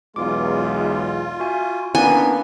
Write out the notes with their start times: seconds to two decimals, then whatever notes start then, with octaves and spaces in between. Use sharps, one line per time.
0.16 B1 E2 G#3 F4 D6
1.40 F#4 E5 G#5
1.95 A#3 B3 C#4 D4 E4 G#5